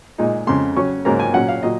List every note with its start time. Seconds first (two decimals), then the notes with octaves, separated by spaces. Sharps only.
0.18 A#2 G#3 D#4
0.47 F2 C#3 G#3 C6
0.76 C#3 F#3 C#4 C#6
1.05 G#2 F#3 A#3 C#4 A#5
1.20 G#5
1.34 A#2 F#3 C#4 F#5
1.48 F5
1.63 A#2 F#3 D#5